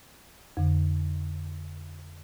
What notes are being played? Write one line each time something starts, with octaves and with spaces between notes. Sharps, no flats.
F2 D3